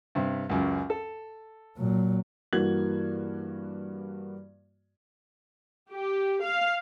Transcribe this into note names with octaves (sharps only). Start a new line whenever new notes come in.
G2 C3
C#2 F#2
A4
A#2 F#3
G2 E3 A#3 F#4 G#6 F#7
G4
F5